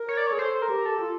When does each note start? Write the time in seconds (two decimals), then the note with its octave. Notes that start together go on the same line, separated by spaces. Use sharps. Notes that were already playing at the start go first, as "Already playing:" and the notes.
Already playing: A#4
0.08 C#5
0.17 D5
0.27 C#5
0.32 G#4
0.39 A4 C5
0.62 A#4
0.70 G4
0.86 A4
1.00 F4